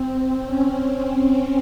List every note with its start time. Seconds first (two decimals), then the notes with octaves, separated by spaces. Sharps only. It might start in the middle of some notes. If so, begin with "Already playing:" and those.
Already playing: C4
0.45 C#4